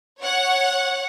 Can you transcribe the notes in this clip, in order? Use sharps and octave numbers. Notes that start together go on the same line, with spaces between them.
C#5 F#5